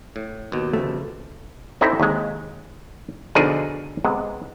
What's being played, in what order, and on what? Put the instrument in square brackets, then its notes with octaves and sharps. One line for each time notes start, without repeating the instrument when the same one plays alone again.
[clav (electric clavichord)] A2
D#2 B2
[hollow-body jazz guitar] C#3 F3 A3
[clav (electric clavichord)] C4 D#4 E4 G4 A4 C5
D#2 C3 G#3
B2 D3 F3 D4 D#4 G#4
C3 G#3 B3